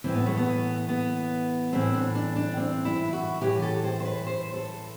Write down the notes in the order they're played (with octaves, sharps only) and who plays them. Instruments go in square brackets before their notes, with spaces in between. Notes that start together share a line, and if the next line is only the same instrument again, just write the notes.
[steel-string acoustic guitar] A2 E3 C4
B3
A3
B3
B3
A2 E3 C4
D4
D4
D4
C4
E4
F#4
A2 E3 G4
G4
A4
C5
C5
B4
C5
A4